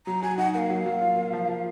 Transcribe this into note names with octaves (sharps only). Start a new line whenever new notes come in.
F#3 A#5
F#4 G#5
D#4 F#5
A#3 F5 F#5
F#3
F#3
F4
A#3
F3
F3